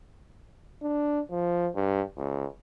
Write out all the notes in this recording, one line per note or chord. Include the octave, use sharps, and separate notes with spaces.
D4
F3
G2
C#2